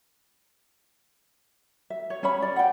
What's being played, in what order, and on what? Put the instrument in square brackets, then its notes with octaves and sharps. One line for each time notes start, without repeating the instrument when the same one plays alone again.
[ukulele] E5
C#5
C#4 C#5 B5
D5
F#5 G5